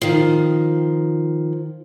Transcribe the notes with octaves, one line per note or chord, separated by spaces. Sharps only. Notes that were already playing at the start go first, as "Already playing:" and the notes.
D#3 F3